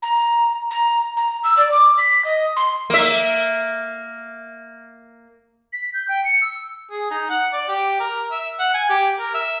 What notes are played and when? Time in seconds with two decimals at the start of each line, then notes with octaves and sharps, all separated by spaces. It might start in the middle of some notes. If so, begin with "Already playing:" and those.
0.02 A#5
0.71 A#5
1.17 A#5
1.44 E6
1.57 D5
1.72 D6
1.98 B6
2.25 D#5
2.56 C6
2.90 A#3 E5
5.73 B6
5.94 G6
6.08 G5
6.24 C#7
6.42 E6
6.91 G#4
7.11 D#4
7.29 F#5
7.53 D5
7.69 G4
8.00 A#4
8.31 E5
8.60 F#5
8.74 G#5
8.90 G4
9.19 A#4
9.34 E5